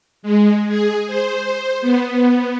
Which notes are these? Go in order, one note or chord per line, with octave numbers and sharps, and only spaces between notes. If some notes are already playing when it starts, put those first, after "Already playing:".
G#3
G#4
C5
B3